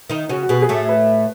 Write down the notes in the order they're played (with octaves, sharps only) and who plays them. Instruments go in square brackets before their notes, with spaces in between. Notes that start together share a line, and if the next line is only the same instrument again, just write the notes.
[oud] D#3 D#4
[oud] C#3 C#4 [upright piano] F#4
[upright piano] F#4
[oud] B2 B3 [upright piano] G#4
[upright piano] G#4
[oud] A2 A3 [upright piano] A4
[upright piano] B4